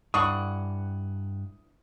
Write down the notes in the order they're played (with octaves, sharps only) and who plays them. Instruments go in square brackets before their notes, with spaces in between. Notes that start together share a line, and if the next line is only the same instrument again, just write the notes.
[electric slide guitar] G2 F#5 [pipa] E3 D4 C#6 [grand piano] D#6